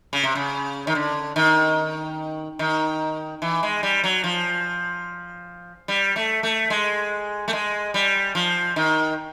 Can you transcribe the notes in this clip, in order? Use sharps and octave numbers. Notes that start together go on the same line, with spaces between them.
C#3
C3
C#3
D#3
D3
D#3
D#3
E3
G#3
G3
F#3
F3
G3
A3
A3
G#3
A3
G#3
G3
F3
D#3